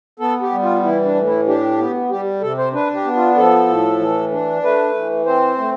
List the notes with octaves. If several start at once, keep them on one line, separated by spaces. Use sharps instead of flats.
B3 A4
G4
G3
F4
E3 E4
D4
A2
E4
D4 G4
B3
G3 G4
C3 A4
C5
D4 B4
G4
B3
F4
F3 A4
A2
E3
D4
A3 B4
E3
C4 C5
A3